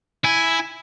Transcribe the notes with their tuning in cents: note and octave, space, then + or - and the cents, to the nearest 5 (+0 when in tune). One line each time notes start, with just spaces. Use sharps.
E4 +0 G#5 +0